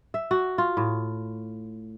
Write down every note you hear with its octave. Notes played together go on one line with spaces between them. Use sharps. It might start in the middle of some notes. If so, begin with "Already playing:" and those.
E5
F#4
F4
A2